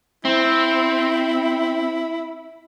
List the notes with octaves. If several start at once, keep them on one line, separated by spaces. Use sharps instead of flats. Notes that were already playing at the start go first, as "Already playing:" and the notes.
C4 E4